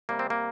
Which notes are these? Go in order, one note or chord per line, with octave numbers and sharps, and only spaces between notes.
C3 G3 A#3
C4
A#3